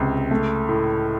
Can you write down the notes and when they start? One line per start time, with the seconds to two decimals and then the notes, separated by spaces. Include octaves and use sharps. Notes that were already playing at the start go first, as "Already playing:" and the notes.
Already playing: C#2 C3
0.31 A3
0.69 A2